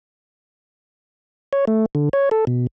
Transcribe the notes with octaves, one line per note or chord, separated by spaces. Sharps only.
C#5
A3
D3
C#5
A4
B2